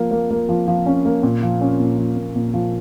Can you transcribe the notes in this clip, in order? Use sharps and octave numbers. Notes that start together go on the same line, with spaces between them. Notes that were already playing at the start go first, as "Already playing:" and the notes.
Already playing: F3 A#3
A#3
A#3
F3
F3
C#4
A#3
A#2
F3
C#4
A#2
F3
A#2
A#2
F3